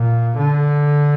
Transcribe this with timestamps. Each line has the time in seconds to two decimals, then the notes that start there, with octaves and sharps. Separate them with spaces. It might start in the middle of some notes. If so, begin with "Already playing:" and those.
Already playing: A#2
0.39 D3